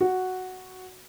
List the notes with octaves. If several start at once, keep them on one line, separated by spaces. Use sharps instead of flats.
F#4